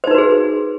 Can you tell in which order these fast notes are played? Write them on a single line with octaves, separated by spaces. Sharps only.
C5 D#4 B4 F#4 G#4